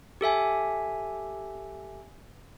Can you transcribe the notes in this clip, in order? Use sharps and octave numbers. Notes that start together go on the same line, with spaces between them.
G4 A4 E5 G#5